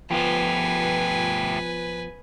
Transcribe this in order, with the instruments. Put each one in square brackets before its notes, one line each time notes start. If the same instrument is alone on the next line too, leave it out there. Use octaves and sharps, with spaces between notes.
[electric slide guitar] F3 B3 F4 [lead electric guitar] A3 G4 [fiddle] B4 G#5